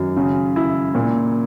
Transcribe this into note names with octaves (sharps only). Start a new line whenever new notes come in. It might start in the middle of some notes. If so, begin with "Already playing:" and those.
Already playing: F#2 D#3
C#3
E4
A#2